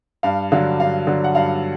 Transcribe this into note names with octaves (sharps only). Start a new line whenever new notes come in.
G2 F5
D3 F#3 F5
G2 F5
D3 F#3
F#5
G2 F5